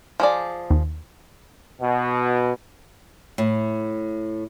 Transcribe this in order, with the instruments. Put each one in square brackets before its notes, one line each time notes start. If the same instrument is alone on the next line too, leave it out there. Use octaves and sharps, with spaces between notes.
[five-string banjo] F3 G#4 D5
[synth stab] D#2
[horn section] B2
[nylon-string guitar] A2